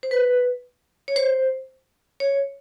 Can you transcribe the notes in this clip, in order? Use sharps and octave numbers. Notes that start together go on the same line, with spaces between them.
C5
B4
C#5
C5
C#5